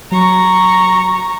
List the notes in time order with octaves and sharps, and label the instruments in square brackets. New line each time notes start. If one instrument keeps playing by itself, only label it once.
[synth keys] F#3 [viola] A#5 C#6